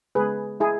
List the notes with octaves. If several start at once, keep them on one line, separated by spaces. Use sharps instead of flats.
C#3 G#3 B3 G#4 B4
E4 G#4